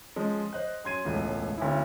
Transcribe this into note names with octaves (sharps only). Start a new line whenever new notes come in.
F3 G#3 C#4
C5 D#5 F#6
F#2 C6 G#6 D#7
E1 C#2 A2
D1 F#2 E4